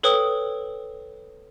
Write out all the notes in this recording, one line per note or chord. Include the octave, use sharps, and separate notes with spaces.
A4 B4 C#5 G5 D#6